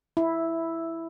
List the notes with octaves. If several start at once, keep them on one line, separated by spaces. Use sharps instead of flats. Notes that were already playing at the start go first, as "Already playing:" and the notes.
E4